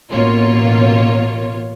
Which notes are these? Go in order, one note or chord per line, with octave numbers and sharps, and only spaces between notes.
A1 B2 A#3 F4 C#5